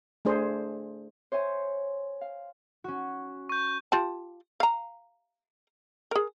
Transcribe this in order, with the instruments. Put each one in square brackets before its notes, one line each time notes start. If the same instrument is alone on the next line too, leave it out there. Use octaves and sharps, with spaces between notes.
[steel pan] A3 D4 G#4 C5
[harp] C5 C#5 E5 G#5
F5
C#4 F#4
[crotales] C#6 G6
[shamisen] F4 G4 A5
F5 A#5
G#4 A#4